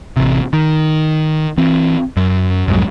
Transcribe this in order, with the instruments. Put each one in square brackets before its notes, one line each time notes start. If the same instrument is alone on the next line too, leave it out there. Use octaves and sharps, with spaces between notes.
[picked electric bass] A1 C3
D#3
E3 C4
F#2
B1 F2 G#2 F#3